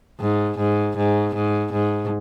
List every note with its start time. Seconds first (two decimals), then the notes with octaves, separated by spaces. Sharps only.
0.21 G#2
0.58 G#2
0.97 G#2
1.35 G#2
1.73 G#2